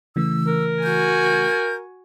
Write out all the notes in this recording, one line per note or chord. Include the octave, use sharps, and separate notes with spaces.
C#3 E3 A3 E6
A#4
F#4 G#5 G6